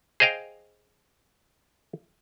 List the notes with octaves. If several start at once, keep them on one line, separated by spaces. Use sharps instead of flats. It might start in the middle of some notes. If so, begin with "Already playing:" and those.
G#4 C5 D#5 F5 G5